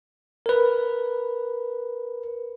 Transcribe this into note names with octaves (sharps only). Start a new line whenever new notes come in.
A#4 B4